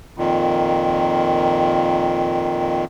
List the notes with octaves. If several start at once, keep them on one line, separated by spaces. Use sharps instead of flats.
F2 A#2 D#3